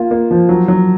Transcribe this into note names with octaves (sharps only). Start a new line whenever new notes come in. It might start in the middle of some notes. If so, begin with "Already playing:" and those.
Already playing: A#3 F4
A#3
F3
F#3
F#3